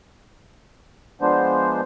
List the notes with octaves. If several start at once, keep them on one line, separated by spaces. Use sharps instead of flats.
F3 G#3 B3 D4 C5